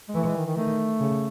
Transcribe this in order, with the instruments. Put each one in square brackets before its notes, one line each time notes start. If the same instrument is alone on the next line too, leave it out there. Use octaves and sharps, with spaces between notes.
[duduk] G#3
[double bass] E3 [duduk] A3
[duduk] G#3
D#3
D#3
[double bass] D#3 [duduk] A3
[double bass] C#3